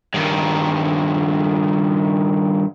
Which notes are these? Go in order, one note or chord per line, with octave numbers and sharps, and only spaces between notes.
G2 D#3